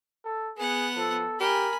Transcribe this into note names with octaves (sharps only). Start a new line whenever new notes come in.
A4
B3 G#4 F#5
F3 A4
G4 A#4 G#5 B5